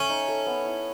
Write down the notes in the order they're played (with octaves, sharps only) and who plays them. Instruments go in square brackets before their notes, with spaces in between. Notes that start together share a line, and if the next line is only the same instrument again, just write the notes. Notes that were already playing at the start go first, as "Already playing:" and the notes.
Already playing: [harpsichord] C#4 [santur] A4 C#5 E5
[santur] D#4
A4
B3
E4